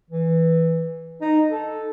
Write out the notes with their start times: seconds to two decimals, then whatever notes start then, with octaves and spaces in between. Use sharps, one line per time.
0.10 E3
1.21 D#4
1.51 A4